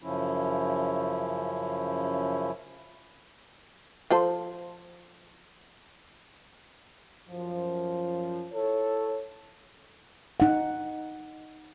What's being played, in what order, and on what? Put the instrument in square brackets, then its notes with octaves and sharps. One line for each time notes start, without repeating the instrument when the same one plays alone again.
[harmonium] F#2 C#3 F3 C#4 E4
[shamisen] F3 A4 C5
[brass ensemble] F#2 F3
E4 A4 C#5
[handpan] D#4 F#5